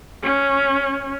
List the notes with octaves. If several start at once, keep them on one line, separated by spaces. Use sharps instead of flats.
C#4